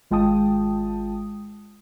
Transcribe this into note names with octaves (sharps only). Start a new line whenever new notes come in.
G#1 G#3 F4 G5 A5 D#6